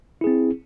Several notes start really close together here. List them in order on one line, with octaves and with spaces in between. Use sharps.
E4 G#4 C4